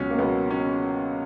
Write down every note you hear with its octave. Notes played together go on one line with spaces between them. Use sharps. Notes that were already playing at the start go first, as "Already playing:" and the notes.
Already playing: C#2 B2 F#3 C#4
A#3
C#2 B2 F#3 B3
C#4